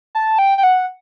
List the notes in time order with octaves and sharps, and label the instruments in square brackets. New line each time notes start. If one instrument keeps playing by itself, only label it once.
[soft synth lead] A5
G5
G5
F#5